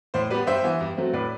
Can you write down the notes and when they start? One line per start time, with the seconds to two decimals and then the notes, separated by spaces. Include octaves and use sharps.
0.14 A2 C5
0.30 G3 B3 B4 D5
0.47 G2 C5 E5
0.64 E3 B3
0.80 G2
0.97 F#3 A3 C4
1.13 A2 B4 D5